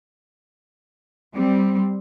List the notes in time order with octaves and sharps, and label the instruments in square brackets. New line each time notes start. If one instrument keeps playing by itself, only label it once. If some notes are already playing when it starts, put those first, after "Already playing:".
[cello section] G3 C4